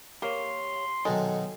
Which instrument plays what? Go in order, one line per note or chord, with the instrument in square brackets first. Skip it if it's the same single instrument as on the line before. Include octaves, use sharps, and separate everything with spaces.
[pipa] A#3 [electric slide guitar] G4 C#5 [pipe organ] C6
[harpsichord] B2 D#3 F#3 [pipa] G#3 [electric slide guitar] A4